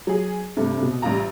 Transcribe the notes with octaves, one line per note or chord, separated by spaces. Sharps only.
F#3 G#4
G2 C3 A3
B2
A1 G3 F4 A#5